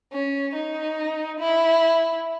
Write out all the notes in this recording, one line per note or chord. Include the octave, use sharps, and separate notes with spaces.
C#4
D#4
E4